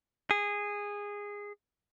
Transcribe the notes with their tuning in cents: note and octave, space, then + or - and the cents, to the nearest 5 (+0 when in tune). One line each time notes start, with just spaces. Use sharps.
G#4 -15